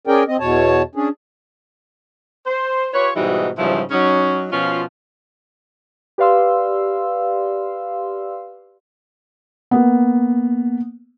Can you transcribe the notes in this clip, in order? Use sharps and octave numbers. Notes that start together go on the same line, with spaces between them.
C#4 G#4 A#4 D5 G5
C4 D#5
E2 B2 C#5 A5
C#4 D4 G#4
C5
F4 G4 B4 C#5
G#2 B2 E3 G3 D#4 F#4
G#2 C#3 E3 F3 G3
F#3 C#4 D#4
B2 F3 C#4 F4
G4 B4 D5 F5 C6 E6
A#3 B3